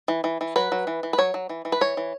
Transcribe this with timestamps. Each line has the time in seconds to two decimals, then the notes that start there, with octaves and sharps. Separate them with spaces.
0.08 E3
0.24 E3
0.41 E3
0.56 F#3 B4
0.72 F#3
0.87 E3
1.03 E3
1.13 B4
1.18 F#3 C#5
1.34 F#3
1.49 E3
1.65 E3
1.72 B4
1.81 E3 C#5
1.97 E3